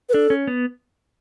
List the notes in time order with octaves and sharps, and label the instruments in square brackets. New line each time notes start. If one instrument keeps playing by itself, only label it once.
[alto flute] B4
[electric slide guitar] D4 [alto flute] A4
[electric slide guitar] C#4
B3